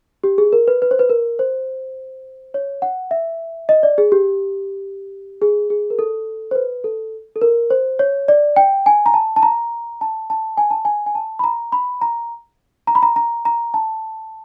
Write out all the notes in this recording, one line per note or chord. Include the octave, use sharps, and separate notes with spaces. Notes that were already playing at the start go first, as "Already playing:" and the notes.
G4
G#4
A#4
B4
B4
C5
B4
A#4
C5
C#5
F#5
E5
D#5
D5
G#4
G4
G#4
G#4
A#4
A4
C5
B4
A4
A4
A#4
C5
C#5
D5
G5
G#5
A#5
A5
A5
A#5
A5
A5
G#5
A5
G#5
G#5
A5
B5
A#5
B5
A#5
A#5
B5
A#5
A#5
A#5
A5